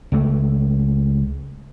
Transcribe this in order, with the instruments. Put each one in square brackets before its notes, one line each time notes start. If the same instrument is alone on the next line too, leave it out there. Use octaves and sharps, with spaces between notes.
[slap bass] C#2 A3